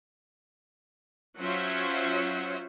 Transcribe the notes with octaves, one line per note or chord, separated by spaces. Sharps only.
F#3 C#4 F4 C5 E5 F#5